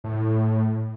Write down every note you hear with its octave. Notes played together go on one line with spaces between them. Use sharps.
A2